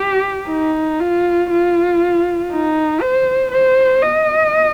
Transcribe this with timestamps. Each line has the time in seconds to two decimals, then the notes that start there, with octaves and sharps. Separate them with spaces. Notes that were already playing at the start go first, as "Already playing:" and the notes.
Already playing: G4
0.48 D#4
1.00 F4
1.51 F4
2.51 D#4
3.01 C5
3.52 C5
4.02 D#5